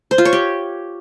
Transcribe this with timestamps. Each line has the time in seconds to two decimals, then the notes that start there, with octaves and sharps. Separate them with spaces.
0.11 C5
0.18 F4
0.25 C#5
0.33 G4